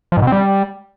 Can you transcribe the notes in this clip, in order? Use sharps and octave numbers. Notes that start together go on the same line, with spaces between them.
F3
G#2
B2
C4
G3